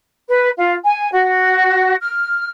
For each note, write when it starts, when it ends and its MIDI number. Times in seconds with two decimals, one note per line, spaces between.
0.28 0.48 71
0.57 0.73 65
0.83 1.10 80
1.11 1.95 66
1.99 2.49 89